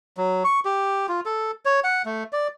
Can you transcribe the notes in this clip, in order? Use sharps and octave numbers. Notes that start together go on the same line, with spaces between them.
F#3
C#6
G4
F4
A4
C#5
F#5
A3
D5